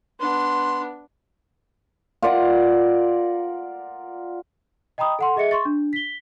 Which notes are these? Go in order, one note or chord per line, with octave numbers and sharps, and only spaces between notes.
B3 D4 C6
F4 A#4 D5 F#5
D#5 G5 A#5 B5 D#6
A4 F#5 C6
G#4 D#5 E5 C#7
C6 C#6 A6
D4
B6 G7